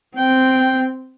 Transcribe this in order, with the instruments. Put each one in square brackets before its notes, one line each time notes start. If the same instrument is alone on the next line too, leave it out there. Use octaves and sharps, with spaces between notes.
[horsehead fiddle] C4 [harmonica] G5